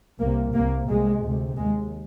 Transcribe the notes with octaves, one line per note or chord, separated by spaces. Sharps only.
C2 C3 A#3
C2 C3 A#3
C2 C3 G#3
D2 C3
D#2 G#3